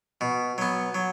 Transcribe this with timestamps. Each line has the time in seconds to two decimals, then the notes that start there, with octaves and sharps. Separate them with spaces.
0.21 B2
0.58 F#3 B3
0.95 F#3